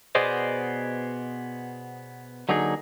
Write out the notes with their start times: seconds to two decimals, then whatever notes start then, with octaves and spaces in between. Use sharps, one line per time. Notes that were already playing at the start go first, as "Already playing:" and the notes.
0.15 B2 B3 G#4 C5 D5 D#5
2.49 D3 F#3 A#3 D#4 G#4